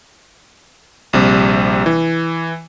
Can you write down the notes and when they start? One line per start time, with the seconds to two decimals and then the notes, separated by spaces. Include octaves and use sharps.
1.13 A#1 C3 G3
1.86 E3